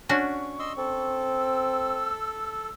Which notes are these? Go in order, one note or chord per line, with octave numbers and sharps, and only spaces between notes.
C#4 D4 F#4 C#6
D#5 C6 E6
C4 A4
E6